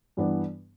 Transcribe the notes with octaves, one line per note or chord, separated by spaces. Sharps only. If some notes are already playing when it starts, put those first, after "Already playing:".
G2 E3 B3 D4